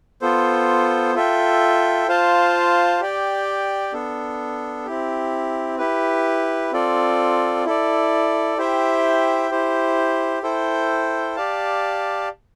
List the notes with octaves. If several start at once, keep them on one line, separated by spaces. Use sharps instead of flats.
B3 F4 A4 C5
F4 A4 E5 G5
F4 C5 F5 A5
G4 D5 G5
B3 D4 A4
C4 E4 G4
E4 G4 B4
C4 F4 A4 D5
E4 A4 D5
E4 G4 C5 E5 G5
E4 G4 C5
E4 A4 C5 G5
G4 D5 F5 A5